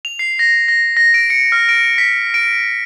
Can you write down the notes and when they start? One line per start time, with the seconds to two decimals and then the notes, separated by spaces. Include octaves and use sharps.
0.05 F7
0.19 C7
0.39 A#6
0.68 A#6
0.97 A#6
1.14 D7
1.30 C#7
1.52 F6
1.69 D7
1.98 B6
2.34 D7